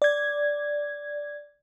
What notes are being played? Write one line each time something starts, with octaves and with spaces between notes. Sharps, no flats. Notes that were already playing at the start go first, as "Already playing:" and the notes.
D5 G#6